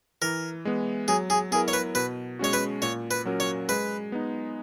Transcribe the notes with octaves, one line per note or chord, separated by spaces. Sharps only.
E3 A#4
G#3 B3
F#3 G#4
G#4
B3 E4 G#4 A#4
C#5
B4
B2 B4
G#3 C#4 F#4 C#5
B4
A#2 C#5
B4
F#3 C#4 F#4 A#4
C#5
G#3 B4
B3 D#4